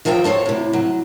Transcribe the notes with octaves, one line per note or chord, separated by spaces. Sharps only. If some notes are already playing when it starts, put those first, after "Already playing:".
C#3 F3 C5 E5 G5 A#5
F#4 A4 C5 C#5
A2 C3
F#3